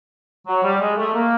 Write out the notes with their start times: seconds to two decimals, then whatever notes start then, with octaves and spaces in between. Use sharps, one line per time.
0.47 F#3
0.63 G3
0.80 G#3
0.98 A3
1.14 A#3